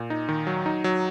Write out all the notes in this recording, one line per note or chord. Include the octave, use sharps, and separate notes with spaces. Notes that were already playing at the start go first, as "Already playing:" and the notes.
Already playing: A#2
D#4
D#3
F#3
D#4
F#3